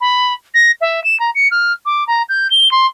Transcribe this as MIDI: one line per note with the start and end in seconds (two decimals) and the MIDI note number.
0.01 0.34 83
0.54 0.72 94
0.81 1.03 76
1.04 1.19 100
1.20 1.31 82
1.35 1.48 97
1.51 1.73 89
1.86 2.07 86
2.07 2.23 82
2.29 2.48 91
2.51 2.71 103
2.71 2.87 84